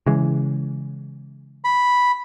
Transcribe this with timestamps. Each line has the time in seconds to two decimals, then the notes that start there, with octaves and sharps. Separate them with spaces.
0.06 C#3 E3 G#3
1.64 B5